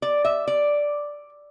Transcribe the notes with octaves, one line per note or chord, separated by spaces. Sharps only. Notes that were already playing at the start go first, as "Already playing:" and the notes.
D5
E5
D5